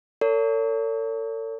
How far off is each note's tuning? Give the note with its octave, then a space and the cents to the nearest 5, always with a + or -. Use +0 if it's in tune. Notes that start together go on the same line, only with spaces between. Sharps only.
A4 +45 C#5 +35